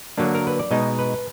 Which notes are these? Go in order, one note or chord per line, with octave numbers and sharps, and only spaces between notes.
D3 F#3 A#3 D4
A#4
B4
D5
B2 G#3 D#4 D#5
B4